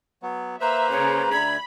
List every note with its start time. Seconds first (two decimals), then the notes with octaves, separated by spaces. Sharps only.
0.23 F#3 B3
0.61 A#3 B4 C5 E5 A#5
0.91 C#3 C#5
1.32 D2 D3 B5 G#6